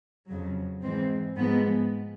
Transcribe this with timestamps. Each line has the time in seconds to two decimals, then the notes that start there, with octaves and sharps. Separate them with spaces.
0.27 F2 C#3 F#3
0.82 G#2 E3 G#3 C4
1.36 G#2 F3 G#3 B3